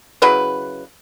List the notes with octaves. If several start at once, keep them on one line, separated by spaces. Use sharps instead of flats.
C#3 F#3 E4 B4